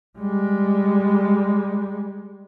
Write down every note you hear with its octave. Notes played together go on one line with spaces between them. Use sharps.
G3 G#3